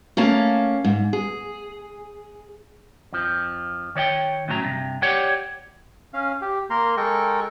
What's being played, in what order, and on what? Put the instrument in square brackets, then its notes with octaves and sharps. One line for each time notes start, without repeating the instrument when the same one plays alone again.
[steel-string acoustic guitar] A3 A#3 C#4 F5 A5
G#2
G#4
[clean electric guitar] F2 F3
D#3 C#5 D5 G5
A2 C#3 F#3 A#4 A#5
E2 G2 C3
G4 C#5 D5 F#5 G5
[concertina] C#4 F5
G4
A#3 A#4 A#5 C6
G#3 A4 A#4 G5 C#6